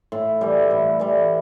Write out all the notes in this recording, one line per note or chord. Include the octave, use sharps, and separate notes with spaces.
A2
E3 G3
A2
E3 G3